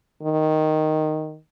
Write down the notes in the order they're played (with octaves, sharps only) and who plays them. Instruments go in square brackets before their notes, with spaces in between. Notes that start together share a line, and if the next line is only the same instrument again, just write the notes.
[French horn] D#3